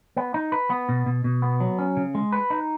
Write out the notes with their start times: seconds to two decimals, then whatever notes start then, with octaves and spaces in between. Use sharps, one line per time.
0.17 B3
0.34 D#4
0.52 B4
0.70 B3
0.89 B2
1.06 B2
1.24 B2
1.42 B3
1.60 F#3
1.79 C#4
1.97 C#3
2.15 G#3
2.32 B4
2.50 D#4